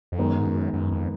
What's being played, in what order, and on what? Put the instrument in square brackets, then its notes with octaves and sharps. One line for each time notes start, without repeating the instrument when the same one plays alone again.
[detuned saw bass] F2
[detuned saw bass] F#2 [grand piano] D#3 G#3 B3 D#4 A#4
[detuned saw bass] G#2
F#2
F#2
F2